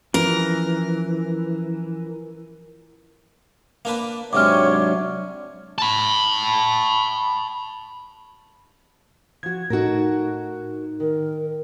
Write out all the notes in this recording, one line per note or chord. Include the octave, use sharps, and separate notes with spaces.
E3 F3 C#4 A#4
A#3 D4 B4
G#2 C3 F#3 G#3 D4 C#5 D6 F6
A5 B5
F3 F#4 G#6
A2 D#4 F#4 A4 A#4
D#3 A#4